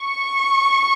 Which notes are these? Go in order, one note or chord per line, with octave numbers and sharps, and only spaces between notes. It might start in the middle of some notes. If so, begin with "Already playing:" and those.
Already playing: C#6